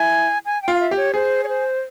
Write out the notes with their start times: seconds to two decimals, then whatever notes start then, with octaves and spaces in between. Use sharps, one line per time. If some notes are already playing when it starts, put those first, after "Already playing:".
Already playing: E4 G#5
0.46 G#5
0.62 G5
0.68 F4
0.74 F5
0.80 E5
0.91 G4
0.97 C#5
1.14 G#4 C5
1.44 C#5
1.49 C5